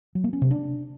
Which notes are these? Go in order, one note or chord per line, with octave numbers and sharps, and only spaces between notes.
F#3
A#3
C#4
C3
D4